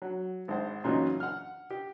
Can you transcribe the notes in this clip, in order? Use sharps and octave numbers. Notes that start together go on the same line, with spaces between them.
F#3
G#1 C5 F#5
F#2 A#2 C#3 E3 F#3 D#4
F#5 F6
G4